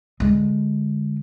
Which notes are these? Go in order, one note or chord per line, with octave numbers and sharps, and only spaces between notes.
D3 G#3